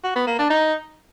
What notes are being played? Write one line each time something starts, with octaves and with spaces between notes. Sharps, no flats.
F#4
B3
A#3
D4
D#4